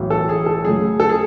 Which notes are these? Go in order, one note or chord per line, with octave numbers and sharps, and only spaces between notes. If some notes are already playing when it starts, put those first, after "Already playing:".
Already playing: B1 A2 E3
A4
G#4
A4
F#2 C#3 F#3 A3 G#4
A4
G#4